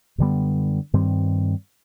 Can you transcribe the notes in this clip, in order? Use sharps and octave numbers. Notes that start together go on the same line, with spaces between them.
F#2 D3 G3 B3
G2 D#3 G3 C4